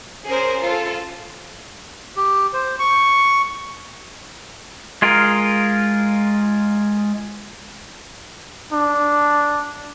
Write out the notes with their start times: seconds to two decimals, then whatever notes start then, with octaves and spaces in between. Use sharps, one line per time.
0.24 C#4 G#4 A#4 C5
0.61 F4 A4
2.16 G4
2.53 C5
2.79 C#6
5.02 G#3 F4 G#4 A#4
8.72 D4